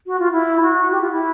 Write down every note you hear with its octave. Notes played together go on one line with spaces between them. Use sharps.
F#4
F4
E4
F#4
G4
F4
E4